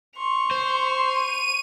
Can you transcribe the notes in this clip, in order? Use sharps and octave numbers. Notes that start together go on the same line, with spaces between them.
C6 C#6 F7
C5
D#7